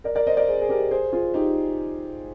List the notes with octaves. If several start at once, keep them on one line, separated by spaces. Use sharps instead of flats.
A#4 D5
A#4 D5
C5 D#5
A#4 D5
G#4 C5
G#4
G4 A#4
G#4 C5
F4 G#4
D#4 G4